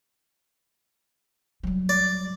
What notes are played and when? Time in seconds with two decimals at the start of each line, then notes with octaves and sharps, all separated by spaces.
1.63 F#3 G3
1.89 D5